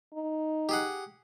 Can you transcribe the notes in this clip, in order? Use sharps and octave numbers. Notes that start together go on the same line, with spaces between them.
D#4
G4 G#4 F#5